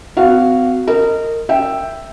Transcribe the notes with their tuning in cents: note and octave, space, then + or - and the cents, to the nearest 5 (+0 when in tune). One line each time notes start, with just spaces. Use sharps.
C4 -40 F#4 +0 F5 -15
A#4 -25 D#5 +0
E5 +0 G5 +0